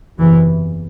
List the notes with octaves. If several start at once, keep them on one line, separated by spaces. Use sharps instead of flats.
F#1 E2 C3 E3